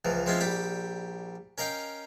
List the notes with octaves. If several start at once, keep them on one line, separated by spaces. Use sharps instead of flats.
C#2 E3 F3
F3 G#3 C4 C#4 E4 F4
A#1 G3 G4 B5
C#4 A#4 D#5 F5 G5